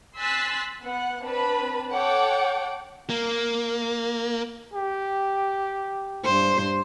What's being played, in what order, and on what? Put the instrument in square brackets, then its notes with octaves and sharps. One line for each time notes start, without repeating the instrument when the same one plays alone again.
[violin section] G#5 C6 E6 F#6 A6 B6
B3 F#5
C4 D4 B4 A5 B5
A4 C#5 F#5 G5 D6
[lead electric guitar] A#3
[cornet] G4
[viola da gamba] G2 C5